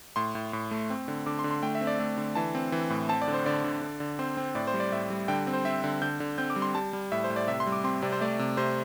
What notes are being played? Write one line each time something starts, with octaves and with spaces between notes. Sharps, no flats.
A2 C6
A2
A2
A3
C4
D3
D3 D6
C6
D3
C6
A3 G5
E5
C4
D5
A3
D3
E3 A5
C4
E3
A2
C4 A5
D5
D3
C5
D3 D5
D3
D3
D3
C4 C5
C4
A2 D5
C5
G3
D5
A2 E5
G3
D3 G5
C4
C5
C4 E5
D3
D3 G6
D3
C4 G6
D6
G3
C6
G3 A5
G3
A2 E5
C5
A2
D5
C3 E5
C6
G3
D6
C4 C6
C3 D5
C5
A3 D5
C3
C3 C5